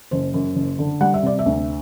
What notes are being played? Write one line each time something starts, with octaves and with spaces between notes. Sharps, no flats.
F#1 C5
F#2
F#1
D3
G3 F#5
E5
C3 D5
E5
D2